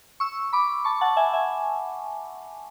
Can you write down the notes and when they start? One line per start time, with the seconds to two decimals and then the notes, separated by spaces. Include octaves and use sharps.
0.20 C#6 E6
0.53 B5 D6
0.84 A5 C#6
1.01 F#5 A5
1.17 E5 G#5
1.33 E5 G#5